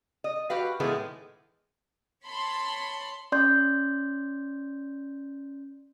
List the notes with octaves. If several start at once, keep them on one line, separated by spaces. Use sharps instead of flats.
D#5
F#4 G4 B4 F5
A2 D#3 E3 G#3 A3 B3
C#5 A5 B5 C6
C#4 D5 C6 G6